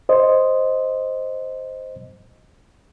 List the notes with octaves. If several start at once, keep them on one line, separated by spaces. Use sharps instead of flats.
C5 D#5